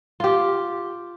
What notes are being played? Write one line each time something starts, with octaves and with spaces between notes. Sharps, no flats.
F4 G4